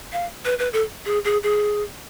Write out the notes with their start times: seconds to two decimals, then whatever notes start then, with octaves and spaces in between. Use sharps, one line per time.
0.13 F5
0.45 B4
0.59 B4
0.73 A4
1.06 G#4
1.25 G#4
1.43 G#4